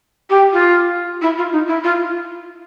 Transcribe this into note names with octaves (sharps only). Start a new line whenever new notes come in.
G4
F4
E4
F4
D#4
E4
F4